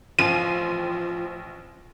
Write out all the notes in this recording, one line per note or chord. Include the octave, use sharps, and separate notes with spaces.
A1 F3 C4 D#7